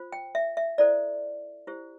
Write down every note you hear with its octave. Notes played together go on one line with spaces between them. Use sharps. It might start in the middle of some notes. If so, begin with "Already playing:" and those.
Already playing: F4 C5
G5
E5
E5
E4 A4 C5 D5
E4 G4 C5